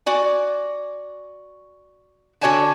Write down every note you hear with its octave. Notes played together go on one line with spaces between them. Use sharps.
F#4 D5 G#5
D3 F#4 C#5 D5 G#5 A5